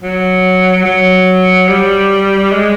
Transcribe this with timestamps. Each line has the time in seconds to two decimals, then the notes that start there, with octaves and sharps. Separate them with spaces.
0.02 F#3
0.85 F#3
1.69 G3
2.53 G#3